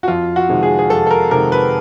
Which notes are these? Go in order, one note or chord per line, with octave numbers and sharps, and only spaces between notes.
F#4
F2 F4
F#4
C3 D#3 G#3
G#4
G#4
F2 A4
A4
A#4
C3 D#3 G#3 A#4
B4